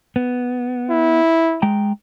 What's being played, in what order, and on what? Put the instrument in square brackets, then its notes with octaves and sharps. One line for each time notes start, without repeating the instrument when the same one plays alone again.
[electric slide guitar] B3
[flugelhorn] E4
[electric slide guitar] G#3 G5 A#5